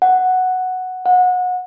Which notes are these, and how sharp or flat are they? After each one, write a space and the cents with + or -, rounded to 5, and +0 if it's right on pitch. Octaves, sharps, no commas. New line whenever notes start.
F#5 +0
F#5 -25